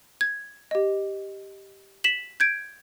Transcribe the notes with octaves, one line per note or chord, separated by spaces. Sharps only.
G#6
G4 D#5
B6 E7 F#7
G6 G#6 D7